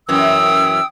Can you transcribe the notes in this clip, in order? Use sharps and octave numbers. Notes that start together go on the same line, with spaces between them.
F#2 E3 G5 D#6 E6